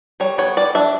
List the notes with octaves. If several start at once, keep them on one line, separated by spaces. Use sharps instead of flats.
G3 C#5
B3 C#5
G3 D5
D4 E5